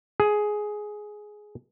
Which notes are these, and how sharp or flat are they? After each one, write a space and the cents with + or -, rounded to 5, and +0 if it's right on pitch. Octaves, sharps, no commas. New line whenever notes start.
G#4 +10